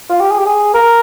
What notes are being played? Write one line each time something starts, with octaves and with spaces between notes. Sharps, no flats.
F4
G4
G#4
G4
G#4
A#4